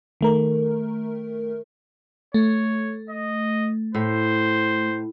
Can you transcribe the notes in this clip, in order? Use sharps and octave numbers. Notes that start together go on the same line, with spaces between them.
D#3 A3 A#4
A3 C#5
D#5
A2 C5